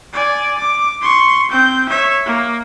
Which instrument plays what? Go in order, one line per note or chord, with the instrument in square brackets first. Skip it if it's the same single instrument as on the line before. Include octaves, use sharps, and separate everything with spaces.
[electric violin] D5 G#5
D6
C6 C#6
C4 G6
C#5 E5
A#3